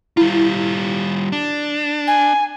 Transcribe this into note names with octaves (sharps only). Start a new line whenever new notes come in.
G3 E4 F4
D4
G#5